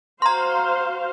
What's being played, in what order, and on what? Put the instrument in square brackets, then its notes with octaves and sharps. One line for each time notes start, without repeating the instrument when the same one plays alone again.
[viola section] F#4 C5 F5 [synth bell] A#5 C6